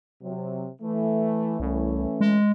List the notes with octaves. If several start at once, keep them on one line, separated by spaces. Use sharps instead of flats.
C3 F#3
E3 A3
C2 E3 A3 C#4
G#3